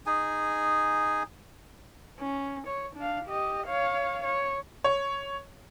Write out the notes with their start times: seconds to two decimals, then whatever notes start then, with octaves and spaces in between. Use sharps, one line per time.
0.06 D#4 G#4 G#5
2.20 C#4
2.67 C#5
2.96 D4 F5
3.26 G4 D#5
3.66 C#5 F5
4.24 C#5
4.84 C#5